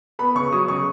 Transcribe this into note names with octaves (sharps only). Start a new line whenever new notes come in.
B3 B5
C#3 C#6
F#3 D#6
C#3 C#6